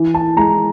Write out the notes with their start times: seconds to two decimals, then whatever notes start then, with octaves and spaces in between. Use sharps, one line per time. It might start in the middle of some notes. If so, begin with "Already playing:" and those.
Already playing: E3
0.14 A5
0.37 G#3 A#5